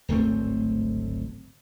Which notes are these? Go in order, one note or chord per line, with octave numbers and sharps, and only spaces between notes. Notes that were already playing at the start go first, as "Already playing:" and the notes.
D1 G#1 A3 C4